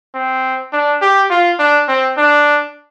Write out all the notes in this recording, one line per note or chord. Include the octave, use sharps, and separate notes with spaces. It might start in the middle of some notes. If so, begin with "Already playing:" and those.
C4
D4
G4
F4
D4
C4
D4